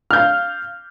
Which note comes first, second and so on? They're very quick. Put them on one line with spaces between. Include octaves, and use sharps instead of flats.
F6 G6 F5